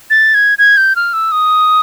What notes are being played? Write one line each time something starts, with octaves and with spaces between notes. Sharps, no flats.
A6
G#6
G#6
G6
F6
E6
D#6